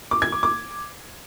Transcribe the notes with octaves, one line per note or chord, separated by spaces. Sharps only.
D6
G#6
D6
D6